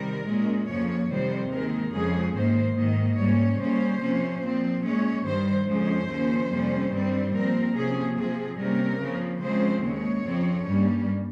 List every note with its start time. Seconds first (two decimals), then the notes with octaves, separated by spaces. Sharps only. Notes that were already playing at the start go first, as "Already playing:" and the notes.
Already playing: C3 D#3 G3 A#4
0.26 A#2 G#3 C#4
0.68 F2 C#3 F3 A#3 C#5
1.09 F2 C3 D#3 G3 C4 C5
1.51 D#2 D#3 G#3 C4 A#4
1.93 F2 C#3 G#3 C#4 G#4
2.34 G#2 D#3 A#3 C5
2.76 G#2 D#3 A#3 D#5
3.18 G#2 G3 A#3 C#4 C#5
3.59 C#3 G3 A#3 C#4 C5
4.00 C3 F3 A#3 C#4
4.42 A#2 F3 C4
4.84 A#2 G#3 C#4 C#5
5.25 G2 D#3 G3 C5
5.67 F2 C#3 G#3 C#4 C5
6.08 D#2 C#3 F3 A#3 C#4
6.50 F2 C3 G3 C#4
6.91 G2 D#3 G3 C4
7.33 A#2 F3 C4 A#4
7.75 C3 F3 A#3 C#4 G#4
8.17 C3 F3 C4 G#4
8.58 C3 G3 A#3 C#4 A#4
9.00 C#3 F3 C4
9.41 C#3 F3 G#3 C4 C5
9.83 D#2 C#3 G#3 C#5
10.24 F2 C#3 F3 C4
10.66 G2 G3 A#3 C#4